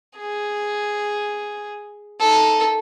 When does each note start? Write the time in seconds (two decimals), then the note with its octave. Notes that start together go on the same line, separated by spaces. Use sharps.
0.17 G#4
2.20 D#4 A4